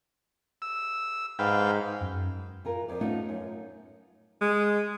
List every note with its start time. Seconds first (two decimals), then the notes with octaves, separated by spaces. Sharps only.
0.62 E6
1.39 G#2 B4 F5 G5
2.01 F#2
2.65 E3 F4 A#4
2.88 F2 D5
3.01 A3 B3 C#4 D#4 F4
3.29 F#2
4.41 G#3